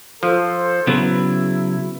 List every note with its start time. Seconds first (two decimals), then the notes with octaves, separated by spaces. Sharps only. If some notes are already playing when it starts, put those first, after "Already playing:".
0.23 F3 A4 C5
0.87 C#3 F#3 B3 E4